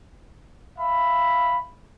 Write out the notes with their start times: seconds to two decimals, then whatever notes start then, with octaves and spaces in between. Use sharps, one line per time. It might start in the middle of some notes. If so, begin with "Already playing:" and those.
0.78 E5 F5 B5